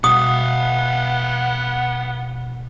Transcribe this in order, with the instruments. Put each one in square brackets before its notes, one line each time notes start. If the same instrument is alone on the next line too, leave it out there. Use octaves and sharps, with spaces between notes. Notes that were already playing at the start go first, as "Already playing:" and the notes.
[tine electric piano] B2 [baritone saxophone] B3 [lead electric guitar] F5 F#5 [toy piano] D#6